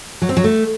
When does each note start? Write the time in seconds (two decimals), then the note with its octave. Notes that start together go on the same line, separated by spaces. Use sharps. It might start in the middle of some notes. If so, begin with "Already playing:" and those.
0.22 F#3
0.29 C4
0.37 F#3
0.44 A3